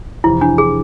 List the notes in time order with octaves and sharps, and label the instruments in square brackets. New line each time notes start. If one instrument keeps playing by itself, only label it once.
[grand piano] F2 C3 E3 [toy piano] E4
[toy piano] D4
G#4